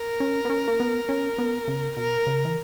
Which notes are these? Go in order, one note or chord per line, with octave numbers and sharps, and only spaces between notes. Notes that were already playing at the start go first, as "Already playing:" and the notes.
Already playing: A#4
C#4
B3
C#4
A#3
B3
C#4
B3
C#3
B2 A#4
C#3
E3